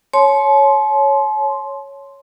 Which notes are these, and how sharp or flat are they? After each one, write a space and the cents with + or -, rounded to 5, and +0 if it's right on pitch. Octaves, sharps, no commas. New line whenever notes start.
C#5 +0 A5 -45 C6 +0